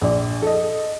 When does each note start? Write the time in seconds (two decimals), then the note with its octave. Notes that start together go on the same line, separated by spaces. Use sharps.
0.01 A#1 D5
0.42 A4 D#5